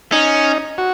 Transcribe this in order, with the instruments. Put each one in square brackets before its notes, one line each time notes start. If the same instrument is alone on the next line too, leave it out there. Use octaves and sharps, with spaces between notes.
[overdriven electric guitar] C#4 [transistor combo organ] D#4
[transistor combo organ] F#4